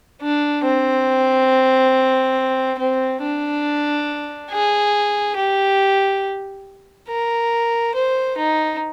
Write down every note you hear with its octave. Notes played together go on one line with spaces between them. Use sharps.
D4
C4
C4
D4
G#4
G4
A#4
C5
D#4